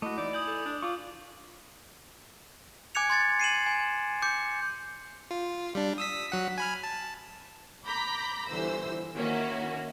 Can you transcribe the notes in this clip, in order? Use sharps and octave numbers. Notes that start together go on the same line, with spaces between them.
A3 E4 F#4 D#5 D6
E3 D#4 D5
G#5 D#6 G6 F#7
A4
D4
F4 C#6 D6
G#5 D6 F#6 G#6 C#7 F7
C6 G#6 A6 C#7
C7 D#7 E7 F#7
G#5
D6 G6 C#7
F4
G3 D4
D#6 E6 B6
F#3 F#5 B6
G#5 B5 F6
A5
A#5 B5 D6 G6 A#6 B6
G1 E3 C5 E6
D#3 A#3 C#4 E4 F#4